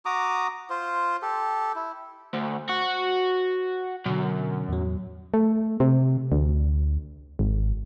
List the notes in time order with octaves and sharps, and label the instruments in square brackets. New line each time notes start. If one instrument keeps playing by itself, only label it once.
[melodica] F#4 A#5 D6 D#6
F4 C5
G4 A4
E4
[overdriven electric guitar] D2 [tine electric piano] C5
[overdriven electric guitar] F#4
[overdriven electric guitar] F#2 [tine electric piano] B2 D3
[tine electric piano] E2 A2 F#3
[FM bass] A3
C3
D2
G#1